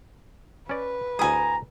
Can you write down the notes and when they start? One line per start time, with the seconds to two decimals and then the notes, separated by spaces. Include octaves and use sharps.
0.69 C#4 B4 D5
1.19 D2 E4 G#4 G#5 A#5 D#6